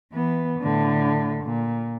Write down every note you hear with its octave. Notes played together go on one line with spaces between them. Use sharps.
E3 B3
A2 D3
A#2